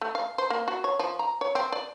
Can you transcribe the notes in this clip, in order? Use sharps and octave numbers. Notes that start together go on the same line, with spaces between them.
A3
F5
C5
A#3
F#4
C#5
F3
A#5
C#5
C4
D5